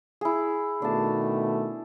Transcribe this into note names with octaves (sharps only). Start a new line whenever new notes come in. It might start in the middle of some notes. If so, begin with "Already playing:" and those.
E4 G#4
B2 D#3 A3 D4 A5